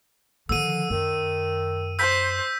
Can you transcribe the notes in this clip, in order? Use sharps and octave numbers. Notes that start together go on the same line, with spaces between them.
D3 D#3 F3 E6 D#7
F#2 D#3
C5 E6 G6 B6